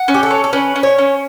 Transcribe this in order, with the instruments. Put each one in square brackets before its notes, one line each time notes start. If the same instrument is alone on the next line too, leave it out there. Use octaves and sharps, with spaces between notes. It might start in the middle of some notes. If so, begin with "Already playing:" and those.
Already playing: [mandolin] F#5
C#4
[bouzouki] G4
A4
[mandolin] C#5
[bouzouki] A4
[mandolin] C#4 [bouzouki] B4
[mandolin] C#4
[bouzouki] C#5
[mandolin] C#4